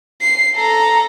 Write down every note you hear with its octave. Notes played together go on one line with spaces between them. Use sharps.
C7
A4 A#5